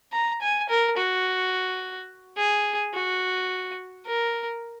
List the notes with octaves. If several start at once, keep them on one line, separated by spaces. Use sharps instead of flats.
A#5
G#5
A#4
F#4
G#4
F#4
A#4